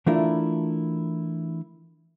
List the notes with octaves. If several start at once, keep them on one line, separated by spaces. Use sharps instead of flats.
E3 A3 D4 E4 F4 A#4